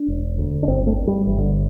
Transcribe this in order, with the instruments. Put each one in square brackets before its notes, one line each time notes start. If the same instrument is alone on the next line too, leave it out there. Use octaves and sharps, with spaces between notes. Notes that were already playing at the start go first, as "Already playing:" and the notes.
Already playing: [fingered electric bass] D4
E1
D2
D4
G1 C4
A3
G2
G3
G1 E3
D3